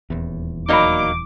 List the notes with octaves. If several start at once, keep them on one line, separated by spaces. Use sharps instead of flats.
D#1 E2
F#3 A#3 D#4 D5 B5 D6